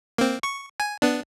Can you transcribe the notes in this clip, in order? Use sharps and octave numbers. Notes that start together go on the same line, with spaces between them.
A#3 C4
C#6
G#5
B3 D4